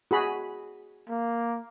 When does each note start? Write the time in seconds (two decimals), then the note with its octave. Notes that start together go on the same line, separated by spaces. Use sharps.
0.11 F#4 G#4 B5
1.09 A#3